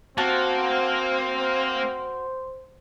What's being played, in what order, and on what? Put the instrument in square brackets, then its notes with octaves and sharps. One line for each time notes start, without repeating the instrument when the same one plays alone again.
[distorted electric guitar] A#3 [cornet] C4 [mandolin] F#4 A5 [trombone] C5